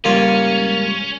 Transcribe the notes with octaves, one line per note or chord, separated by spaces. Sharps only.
C#2 G#2 G3 A#3 C#4 F4 C#5